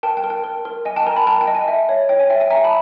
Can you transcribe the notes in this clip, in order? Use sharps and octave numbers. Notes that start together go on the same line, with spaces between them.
A#4 G5 A5
G5
A#4
G5
A#4
A#4
D#5 G#5
G5 A5
A#4 G#5 A#5
A5 B5
A#4 G5 A5
G5
D#5
G#5
E5
C#5
C#5 G5
G#5
E5 G5
G#5
E5 G#5 A#5
A5 B5